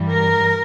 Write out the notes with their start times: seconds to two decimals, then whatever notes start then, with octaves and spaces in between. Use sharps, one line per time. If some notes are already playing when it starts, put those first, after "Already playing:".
Already playing: G2 E3 G3
0.10 A#4